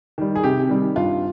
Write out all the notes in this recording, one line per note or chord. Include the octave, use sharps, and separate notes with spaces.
D#3 G3
G#4
C3 G4
D#3 G3
G2 F4